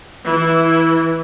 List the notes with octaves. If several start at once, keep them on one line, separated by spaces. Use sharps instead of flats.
E3 E4